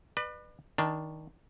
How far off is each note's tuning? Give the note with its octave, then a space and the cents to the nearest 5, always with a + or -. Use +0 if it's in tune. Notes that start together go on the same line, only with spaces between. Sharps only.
B4 -5 D5 +40
D#3 +15 D4 +0 A5 +0